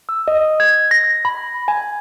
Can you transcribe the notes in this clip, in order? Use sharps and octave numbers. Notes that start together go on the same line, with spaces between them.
E6
D#5
G#6
A#6
B5
G#5